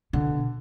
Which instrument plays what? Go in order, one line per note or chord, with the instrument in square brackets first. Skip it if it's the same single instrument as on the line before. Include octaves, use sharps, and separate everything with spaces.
[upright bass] B2 [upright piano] D3